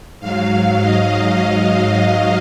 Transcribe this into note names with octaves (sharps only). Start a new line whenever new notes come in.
G#2 F#3 F5
F5
D#5